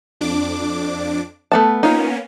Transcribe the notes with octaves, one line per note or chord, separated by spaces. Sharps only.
F2 D4 D6
A3 B3 A5
A#3 B3 C#4 D#4 F4